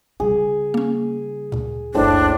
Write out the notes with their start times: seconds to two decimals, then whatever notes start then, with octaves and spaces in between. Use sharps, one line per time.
0.20 C#3 G3 G#4
0.74 A#3 C#4
1.52 D2 A#2
1.94 F#1 C#2 A2 D4 A4 C5